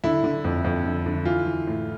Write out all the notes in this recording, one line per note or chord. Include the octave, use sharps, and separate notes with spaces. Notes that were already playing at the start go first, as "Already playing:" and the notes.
D3 E4
D3
F2
F2
D3
D3
E3 F4
E3
A2